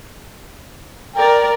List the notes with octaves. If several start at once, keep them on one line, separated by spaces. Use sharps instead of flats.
A#4 D5 G5 A#5